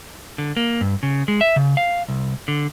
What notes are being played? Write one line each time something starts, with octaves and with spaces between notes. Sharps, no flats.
D3
A#3
G2
C#3
G#3
E5
C#3
F5
C2
D3